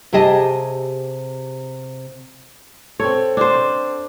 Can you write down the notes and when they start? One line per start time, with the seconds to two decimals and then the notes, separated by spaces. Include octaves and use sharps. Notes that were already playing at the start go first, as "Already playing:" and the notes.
0.13 C3 G4 G#4 D#5 A5
3.00 C4 A4 C#5
3.37 D4 C5